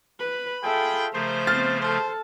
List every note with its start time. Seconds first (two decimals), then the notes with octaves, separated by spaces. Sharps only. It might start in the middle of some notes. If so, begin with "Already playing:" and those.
0.19 B4 B5
0.63 F4 G#4 A4 E5 G5
1.13 C#3 F3 A3 A#4 C5
1.47 B3 C4 F6 A6
1.81 A4 C5 A5